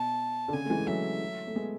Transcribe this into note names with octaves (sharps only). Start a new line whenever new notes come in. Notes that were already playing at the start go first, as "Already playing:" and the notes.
Already playing: B2 A5
D3
C#3 G#5
A3
E3 G#3
F#3 A3 E5
A3
G#3 B3